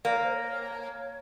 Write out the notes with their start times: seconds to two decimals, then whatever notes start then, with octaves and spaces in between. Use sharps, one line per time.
0.05 A#3 D5
0.14 C#5
0.23 C5
0.34 C#5